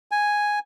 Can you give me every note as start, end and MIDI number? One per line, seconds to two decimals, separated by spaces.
0.11 0.59 80